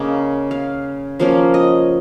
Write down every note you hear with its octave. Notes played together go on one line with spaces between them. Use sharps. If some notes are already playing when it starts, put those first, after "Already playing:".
Already playing: C#3 A#3 C#4 D#5
F5
F3 A#3 C#4 F5
D#5